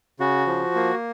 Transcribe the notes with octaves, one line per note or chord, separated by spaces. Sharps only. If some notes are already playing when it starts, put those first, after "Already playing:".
C#3 F#4
F3
A#3